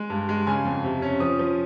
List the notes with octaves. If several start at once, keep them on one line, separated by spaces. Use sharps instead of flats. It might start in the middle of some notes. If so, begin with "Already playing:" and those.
Already playing: G#3
G2
G#3
C#3 G#5
F2
C3
C#4
F3 D#6
F3